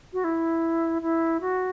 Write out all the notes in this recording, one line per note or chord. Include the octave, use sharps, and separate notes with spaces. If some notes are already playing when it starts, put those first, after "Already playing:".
F#4
E4
E4
F#4